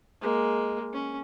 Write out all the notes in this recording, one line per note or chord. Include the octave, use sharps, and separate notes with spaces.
G#3 A#3
C#4